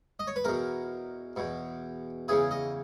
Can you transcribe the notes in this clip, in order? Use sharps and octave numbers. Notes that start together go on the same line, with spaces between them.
D#5
C#5
B4
E2 B2 A#4
E2 B2
E2 C#3 E3 G#4
D#5